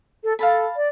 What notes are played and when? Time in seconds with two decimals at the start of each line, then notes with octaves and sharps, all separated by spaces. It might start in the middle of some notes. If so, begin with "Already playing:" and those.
0.24 A4
0.39 A4 F5 A5 B5
0.76 D5